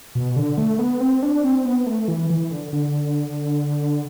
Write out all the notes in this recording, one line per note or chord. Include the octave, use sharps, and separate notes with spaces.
B2
D3
A3
B3
C4
D4
C4
B3
A3
E3
E3
D3
D3